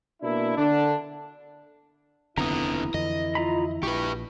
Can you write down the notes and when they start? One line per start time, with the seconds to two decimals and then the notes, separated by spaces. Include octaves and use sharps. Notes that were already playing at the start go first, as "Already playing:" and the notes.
0.22 B2 A#3 D4 E4
0.57 D3 D4
2.38 F1 D#2 D3 B3 C4 E4 A#5 D#6
2.94 F2 D3 E3 D#5
3.35 F4 A#5 B5
3.83 A#1 G4 B4 C#6